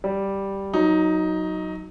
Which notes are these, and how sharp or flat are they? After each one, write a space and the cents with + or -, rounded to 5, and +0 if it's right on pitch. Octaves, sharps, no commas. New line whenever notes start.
G3 +0 D5 +0
F#3 +0 D#4 +10